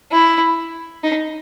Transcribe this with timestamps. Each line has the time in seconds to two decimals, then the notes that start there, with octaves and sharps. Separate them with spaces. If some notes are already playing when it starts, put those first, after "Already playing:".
0.11 E4
1.04 D#4